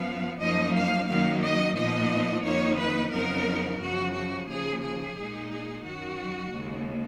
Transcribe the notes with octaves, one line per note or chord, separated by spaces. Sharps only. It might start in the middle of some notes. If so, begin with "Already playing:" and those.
Already playing: F#2 F3 B3 F5
F#2 F3 A#3 D#4 D#5
F5
F#2 D#3 F#3 A#3 D#4 F5
D#5
A#2 F3 B3 D#4 D#5
F2 D#3 A#3 D#4 C#5
B4
F2 C#3 F#3 B3 D#4 A#4
F#2 C#3 F3 F#4
F#4
D#2 C#3 F3 G#4
G#4
A#2 G#3 D#4
G#4
F#2 D#3 F#3 F#4
D#2 C#3 G#3